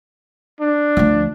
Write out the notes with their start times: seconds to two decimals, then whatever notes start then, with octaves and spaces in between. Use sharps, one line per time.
0.61 D4
0.97 D2 F3